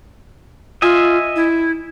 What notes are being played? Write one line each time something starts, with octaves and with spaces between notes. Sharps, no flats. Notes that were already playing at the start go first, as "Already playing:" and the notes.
F4 D#5 E5 G#5
E4